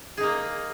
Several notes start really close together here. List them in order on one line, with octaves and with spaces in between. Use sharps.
G#4 D#4 A#3